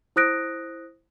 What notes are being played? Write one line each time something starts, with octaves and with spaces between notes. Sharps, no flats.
E4 C5 D#6 F#6 A#6 D7